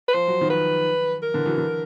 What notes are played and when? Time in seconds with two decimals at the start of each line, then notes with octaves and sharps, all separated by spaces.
0.08 B4
0.14 F3 C5
0.28 F#3
0.41 D#3 F3
0.50 B4
1.23 A#4
1.34 D3 E3
1.46 E3 F#3
1.58 D3 E3